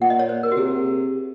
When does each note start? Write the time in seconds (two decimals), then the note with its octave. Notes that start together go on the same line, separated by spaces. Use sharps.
0.01 A#2 F#5
0.10 D#5
0.20 C#5
0.29 C5
0.43 A#4
0.52 F#4
0.57 C3 G#4